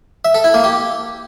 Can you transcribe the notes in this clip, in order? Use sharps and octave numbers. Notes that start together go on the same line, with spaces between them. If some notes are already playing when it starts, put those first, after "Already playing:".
E5
A4
E4
A#3
G4